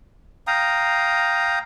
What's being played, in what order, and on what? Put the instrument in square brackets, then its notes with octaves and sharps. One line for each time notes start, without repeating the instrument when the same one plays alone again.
[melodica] F5 G5 A#5 D#6